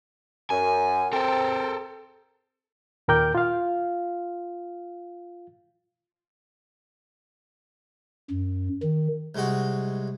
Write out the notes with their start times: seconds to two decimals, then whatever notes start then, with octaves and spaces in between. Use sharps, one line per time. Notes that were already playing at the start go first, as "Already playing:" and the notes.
0.50 F#2 G#5
1.13 C4 A4 A#4
3.08 D#2 A#2 A#4 G5 D6 G6
3.35 F4 F5
8.30 F#2
8.83 D#3
9.35 C2 G#3 F#4